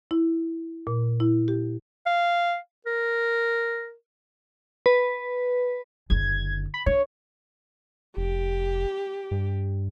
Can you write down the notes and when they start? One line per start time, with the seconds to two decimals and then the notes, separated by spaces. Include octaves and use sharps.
0.11 E4
0.87 A#2
1.20 E4
1.48 G4
2.06 F5
2.86 A#4
4.86 B4
6.10 F#1 D3 G#6
6.74 B5
6.86 D4 C#5
8.17 F1 G4
9.31 G2